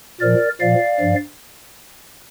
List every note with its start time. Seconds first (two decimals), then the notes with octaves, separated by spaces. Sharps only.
0.21 A#2 F3 A#4 D5
0.60 A#2 F3 D5 F5
1.00 G2 F3